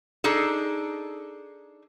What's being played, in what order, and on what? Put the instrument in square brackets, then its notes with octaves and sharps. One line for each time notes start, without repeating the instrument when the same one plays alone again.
[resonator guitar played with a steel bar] D4 D#4 G#4 A4